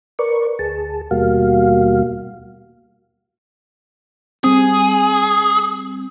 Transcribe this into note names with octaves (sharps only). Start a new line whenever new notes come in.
A#4 B4 D5 C#6
D2 G#4 A5
D#2 B2 G3 A#3 F#4 F5
G3 C4 G#4